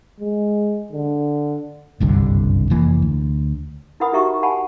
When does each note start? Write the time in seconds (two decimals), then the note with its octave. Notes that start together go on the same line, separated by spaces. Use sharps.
0.20 G#3
0.92 D3
2.00 F#1 C2 G2 D3
2.70 F1 E3 A#3
3.02 D2
4.00 E4 A#4 B4 F#5 B5 D#6
4.12 D#4 F#4 G4 E5 A#5 C#6
4.43 F#5 G#5 A5 B5